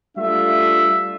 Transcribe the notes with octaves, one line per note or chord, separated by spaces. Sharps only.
G3 A3 D4 F4 E5